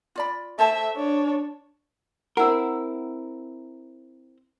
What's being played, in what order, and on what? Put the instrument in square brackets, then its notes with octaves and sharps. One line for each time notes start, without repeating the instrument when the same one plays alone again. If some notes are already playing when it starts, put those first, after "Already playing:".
[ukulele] F4 D5 B5
[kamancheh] A3 E5 [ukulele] A4 C5 A5
[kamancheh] D4 C#5
[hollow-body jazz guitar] C4 E4 A#4 [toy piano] F#5 E6